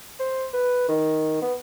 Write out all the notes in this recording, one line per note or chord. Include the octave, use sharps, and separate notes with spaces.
C5
B4
D#3
B3